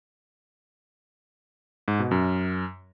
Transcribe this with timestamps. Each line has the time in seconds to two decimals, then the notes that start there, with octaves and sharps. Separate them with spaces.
1.88 G#2
1.99 B2
2.11 F#2